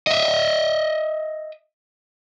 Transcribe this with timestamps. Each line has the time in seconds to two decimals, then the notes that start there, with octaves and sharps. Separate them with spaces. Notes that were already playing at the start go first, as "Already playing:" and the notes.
0.07 D#5 E5